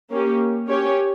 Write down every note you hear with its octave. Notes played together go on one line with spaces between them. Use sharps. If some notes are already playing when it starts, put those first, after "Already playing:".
A#3 C#4 G4
C#4 G4 C#5